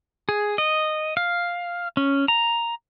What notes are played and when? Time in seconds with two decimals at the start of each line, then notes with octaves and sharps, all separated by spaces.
0.29 G#4
0.58 D#5
1.17 F5
1.97 C#4
2.28 A#5